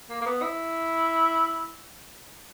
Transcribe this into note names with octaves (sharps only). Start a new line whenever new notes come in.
A#3
A#3
B3
E4